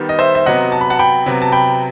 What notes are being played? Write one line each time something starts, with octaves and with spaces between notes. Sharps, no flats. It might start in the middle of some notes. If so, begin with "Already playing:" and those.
Already playing: D#3 G3 B3
D#5
C5 E5
E5
C3 F#3 B3 D#5 F#5
A5
B5
F#5 A5
G5 B5
C3 F#3 B3
A5
G5 B5